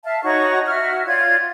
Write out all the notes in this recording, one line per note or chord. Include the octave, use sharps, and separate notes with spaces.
E5 F5 A5
D#4 F#4 C#5 C#6
F#4 E5 F6
F4 C#5 D5 G#6